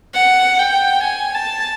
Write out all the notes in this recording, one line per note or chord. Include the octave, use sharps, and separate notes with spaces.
F#5
G5
G#5
A5